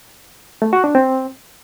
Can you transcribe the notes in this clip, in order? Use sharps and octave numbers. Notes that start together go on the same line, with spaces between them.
A3
F#4
D4
C4